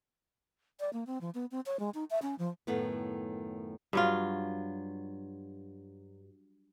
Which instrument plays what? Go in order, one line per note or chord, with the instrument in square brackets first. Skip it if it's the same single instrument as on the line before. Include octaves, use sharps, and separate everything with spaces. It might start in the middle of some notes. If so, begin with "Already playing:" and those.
[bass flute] D5
A#3
C4
F3
B3
C4
C#5
G#3
D#4
E5
C#4
F3
[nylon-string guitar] F#2 A2 D#3 A3 B3
[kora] G2 F#3 F4